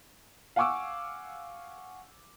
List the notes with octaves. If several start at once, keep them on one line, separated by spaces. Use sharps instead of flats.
F5 F#5 G#5 C#6 D6 E6